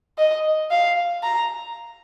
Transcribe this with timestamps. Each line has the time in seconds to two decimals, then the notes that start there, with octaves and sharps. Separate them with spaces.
0.18 D#5
0.71 F5
1.23 A#5